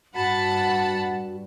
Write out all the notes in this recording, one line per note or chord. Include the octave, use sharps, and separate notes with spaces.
G2 F#4 F#5 A5 B5